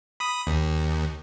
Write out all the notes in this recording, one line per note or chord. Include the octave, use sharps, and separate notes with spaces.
B5 D#6
D#2